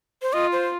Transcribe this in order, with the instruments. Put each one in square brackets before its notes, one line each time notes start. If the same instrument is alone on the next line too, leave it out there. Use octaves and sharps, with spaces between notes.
[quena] C5
[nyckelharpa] F4 [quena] D#5
[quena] C5